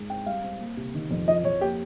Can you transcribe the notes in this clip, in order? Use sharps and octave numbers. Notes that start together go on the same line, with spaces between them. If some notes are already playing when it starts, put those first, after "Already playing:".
Already playing: G#2 G#3
C4 G5
G3 F5
C4
A#3
C3
D#3
F2
F3 D#5
F2 C#5
A#3 G4